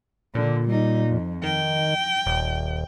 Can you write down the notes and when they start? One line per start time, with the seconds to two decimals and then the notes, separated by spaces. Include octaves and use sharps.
0.35 A#2 D3
0.68 G3 D#4
1.09 F2
1.43 D#3 G5
2.26 D#1